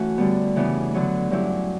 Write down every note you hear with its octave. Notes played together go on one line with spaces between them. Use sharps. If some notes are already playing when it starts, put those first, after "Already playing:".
Already playing: E3 A3 C#4 F#4
D3 G3 B3
C#3 E3 B3 D4
D3 F#3 B3
G2 F#3 C#4 E4 G4